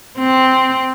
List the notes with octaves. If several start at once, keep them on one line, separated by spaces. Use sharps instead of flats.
C4